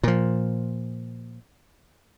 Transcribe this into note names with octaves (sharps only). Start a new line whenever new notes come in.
A#2 F3